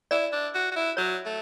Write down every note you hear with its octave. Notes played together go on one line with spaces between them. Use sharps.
E4 D5
D4
F#4
F#4
E4
F#3 C#5
A3